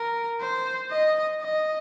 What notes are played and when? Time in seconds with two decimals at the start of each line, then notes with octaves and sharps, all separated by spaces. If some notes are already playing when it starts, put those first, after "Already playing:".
Already playing: A#4
0.41 C5
0.91 D#5
1.41 D#5